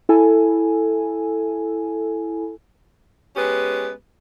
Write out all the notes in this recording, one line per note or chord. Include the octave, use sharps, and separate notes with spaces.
E4 A4 G#5
G#3 B3 C#4 G4 B4